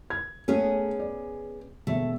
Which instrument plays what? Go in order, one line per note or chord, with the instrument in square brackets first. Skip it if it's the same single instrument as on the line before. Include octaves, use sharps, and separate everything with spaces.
[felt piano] G#6
[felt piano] A3 [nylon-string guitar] B3 C#4 G#4
[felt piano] D5
[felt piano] E1 E5 [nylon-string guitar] A3